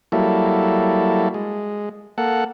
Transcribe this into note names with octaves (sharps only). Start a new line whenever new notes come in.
F#3 G3 A#3 E4 A4
G#3
A#3 A4 F#5